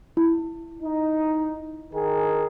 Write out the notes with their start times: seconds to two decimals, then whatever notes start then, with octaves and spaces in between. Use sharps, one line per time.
0.17 E4
0.83 D#4
1.93 D#3 G#4 A#4